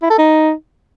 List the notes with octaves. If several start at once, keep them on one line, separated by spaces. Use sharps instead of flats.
E4
A4
D#4